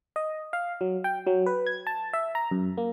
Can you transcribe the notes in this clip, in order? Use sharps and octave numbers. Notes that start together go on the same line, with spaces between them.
D#5
F5
F#3
G5
F#3
B4
G#6
A5
E5
A#5
F#2
A#3